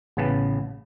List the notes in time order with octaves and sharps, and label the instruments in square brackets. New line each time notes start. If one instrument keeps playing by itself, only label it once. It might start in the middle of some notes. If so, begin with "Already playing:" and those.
[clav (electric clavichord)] A1 C#3 B3 B4 A5